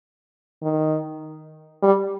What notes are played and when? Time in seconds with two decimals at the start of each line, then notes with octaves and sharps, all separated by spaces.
0.63 D#3
1.83 G3